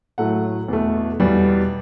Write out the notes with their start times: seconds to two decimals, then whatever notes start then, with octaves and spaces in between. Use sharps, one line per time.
0.18 A2 F#3 A3 F#5
0.68 E2 B2 A3
1.20 E2 B2 G3